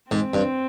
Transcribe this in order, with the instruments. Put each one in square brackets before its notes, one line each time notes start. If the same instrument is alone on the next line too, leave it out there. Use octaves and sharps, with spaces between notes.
[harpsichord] G#2 [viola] C4
[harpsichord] G2